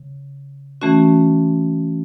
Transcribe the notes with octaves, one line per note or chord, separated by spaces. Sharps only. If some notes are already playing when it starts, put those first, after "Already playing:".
Already playing: C#3
E3 A3 C#4 F#4